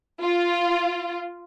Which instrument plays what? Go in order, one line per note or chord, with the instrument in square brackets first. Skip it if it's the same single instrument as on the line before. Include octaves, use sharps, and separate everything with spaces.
[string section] F4